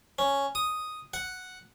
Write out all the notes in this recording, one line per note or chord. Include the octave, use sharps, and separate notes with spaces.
C#4
D#6
F#5